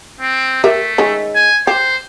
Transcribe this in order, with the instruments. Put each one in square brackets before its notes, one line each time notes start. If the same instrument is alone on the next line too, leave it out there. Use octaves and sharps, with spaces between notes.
[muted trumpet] C4
[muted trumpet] A3 [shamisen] G4 A#4 E5
[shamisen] D#3 G#3 C#4
[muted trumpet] G#5
[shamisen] G4 [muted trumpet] C5